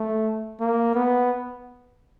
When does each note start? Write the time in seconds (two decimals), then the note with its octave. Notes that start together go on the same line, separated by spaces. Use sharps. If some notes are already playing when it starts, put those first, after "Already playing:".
Already playing: A3
0.61 A#3
0.95 B3